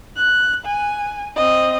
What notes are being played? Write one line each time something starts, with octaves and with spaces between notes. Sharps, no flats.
F#6
G#5
C4 D#5